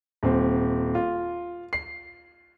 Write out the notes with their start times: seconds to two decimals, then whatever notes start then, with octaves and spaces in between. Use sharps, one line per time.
0.23 D#1 C4
0.95 F4
1.73 C7